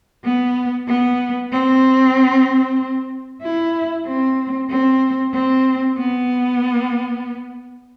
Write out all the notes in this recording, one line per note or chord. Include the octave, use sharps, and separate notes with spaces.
B3
B3
C4
E4
C4
C4
C4
B3